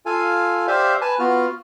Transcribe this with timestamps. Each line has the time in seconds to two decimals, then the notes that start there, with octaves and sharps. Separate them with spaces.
0.06 F4 A4 F5 G#5
0.67 G4 C5 D5 E5 F5
1.01 B4 G#5 A5
1.19 B3 F4 F#4 F6